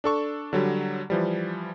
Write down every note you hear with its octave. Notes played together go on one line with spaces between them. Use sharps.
D4 A4 C#6
D3 F#3 G3
E3 F3 G3